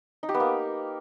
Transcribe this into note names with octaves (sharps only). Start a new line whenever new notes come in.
D#4
G4
B3
A#3